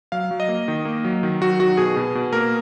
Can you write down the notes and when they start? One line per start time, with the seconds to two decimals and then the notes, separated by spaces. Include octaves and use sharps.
0.12 F#3 F5
0.31 F#3
0.40 D#5
0.48 A#3
0.68 D#3
0.85 A#3
1.04 F#3
1.23 D#3
1.41 F#3 F#4
1.59 D#3 F#4
1.77 B2 G#4
1.96 B2
2.15 B2
2.33 A#3 A#4